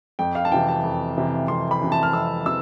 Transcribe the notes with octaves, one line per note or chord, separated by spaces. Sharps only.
F2 G5
F5
A5
C3 E3 G5
A5
F2
C3 E3
F2 C6
B5
C3 E3
A5
F6
F2 E6
C3 E3 E6